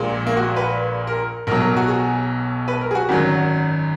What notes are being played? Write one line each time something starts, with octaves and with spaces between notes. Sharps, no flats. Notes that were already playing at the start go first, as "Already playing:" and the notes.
Already playing: A#1 A#2 G#3
A#3
F#4
B4
A#4
B1 B2 F#3 A#4
A#4
F#4
G#4
B4
A#4
G#4
F#4
G#1 F#2 D#3 F#3 F#4